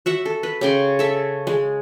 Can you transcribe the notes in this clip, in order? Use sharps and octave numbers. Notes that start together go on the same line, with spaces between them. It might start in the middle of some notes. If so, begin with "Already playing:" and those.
F#4 E5 F#5
A4
B4
C#3 G5 C6
A4 E5 A5
G#3